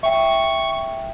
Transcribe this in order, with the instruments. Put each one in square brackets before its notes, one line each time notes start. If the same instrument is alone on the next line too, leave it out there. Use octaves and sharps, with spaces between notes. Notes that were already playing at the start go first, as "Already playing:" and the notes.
[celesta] E5 G5 [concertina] C#6